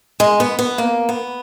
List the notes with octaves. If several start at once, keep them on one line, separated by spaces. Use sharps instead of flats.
G#3
B3
B3
A#3
B3